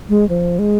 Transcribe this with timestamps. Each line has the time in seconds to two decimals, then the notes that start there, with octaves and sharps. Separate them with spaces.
0.09 G#3
0.29 F3
0.59 G#3